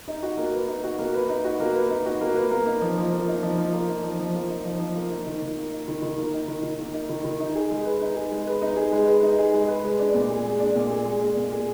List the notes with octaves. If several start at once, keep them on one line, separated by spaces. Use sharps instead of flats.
D#4
F#4
A#3
B4
D#4
F#4
A#3
B4
D#4
F#4
A#3
B4
D#4
F#4
A#3
B4
A#3
D#4
F3
F3
A#3
D#4
F3
F3
A#3
D#4
F3
F3
A#3
D#4
F3
F3
A#3
D#4
D#3
D#3
A#3
D#4
D#3
D#3
A#3
D#4
D#3
D#3
A#3
D#4
D#3
D#3
D#4
G#4
G#3
B4
D#4
G#4
G#3
B4
D#4
G#4
G#3
B4
D#4
G#4
G#3
B4
G#3
D4
A#2
G#4
G#3
D4
A#2
G#4
G#3
D4
A#2
G#4